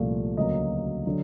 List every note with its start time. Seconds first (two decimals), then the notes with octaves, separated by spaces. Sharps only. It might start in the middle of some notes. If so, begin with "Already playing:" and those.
Already playing: C2 A#2 F3 A3
0.37 D2 C#3 F#3 A#3 D#5
1.06 D3 F#3